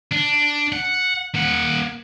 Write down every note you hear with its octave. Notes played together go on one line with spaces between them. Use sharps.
D4
F#5
A#3 F#5